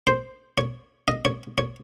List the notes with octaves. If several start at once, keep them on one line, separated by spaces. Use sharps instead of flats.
C5
C#5
D#5
C#5
C#5